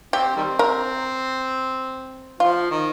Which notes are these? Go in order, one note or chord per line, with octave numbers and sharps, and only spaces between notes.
C4 G4
D#3 G3 C4
A#4
F3 F4
D#3